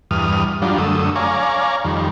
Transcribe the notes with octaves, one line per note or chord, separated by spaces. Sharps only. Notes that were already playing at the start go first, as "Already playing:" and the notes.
E2 G2 D#6 F6
F#3 G3 D4 F4
F#2 D3 A3 D#6 E6
C#5 D5 F5 G#5 A#5
F2 D#3 G3